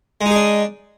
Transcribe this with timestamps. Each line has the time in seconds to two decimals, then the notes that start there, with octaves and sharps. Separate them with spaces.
0.21 G#3
0.26 D#4
0.31 G#4
0.35 D4